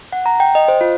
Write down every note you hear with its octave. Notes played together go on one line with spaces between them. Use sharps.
F#5
A#5
G5
D#5
C5
F4